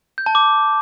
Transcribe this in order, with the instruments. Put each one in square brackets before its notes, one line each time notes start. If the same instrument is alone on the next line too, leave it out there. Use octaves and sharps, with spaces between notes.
[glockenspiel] G6
A5
D6